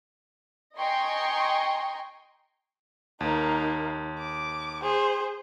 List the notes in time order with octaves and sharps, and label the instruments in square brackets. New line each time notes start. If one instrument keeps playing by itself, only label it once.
[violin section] D#5 G5 G#5 A#5 C6 C#6
[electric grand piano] D#2 [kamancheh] A#3 D#4
[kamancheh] D6
G#4 C5